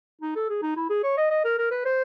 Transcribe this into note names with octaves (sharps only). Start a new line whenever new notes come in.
D#4
A4
G#4
D#4
E4
G#4
C#5
D#5
D#5
A#4
A#4
B4
C5